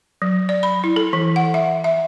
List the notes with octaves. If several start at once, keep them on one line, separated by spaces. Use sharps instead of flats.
F#3
D5
B5
E4
A4
E3
F#5
E5
E5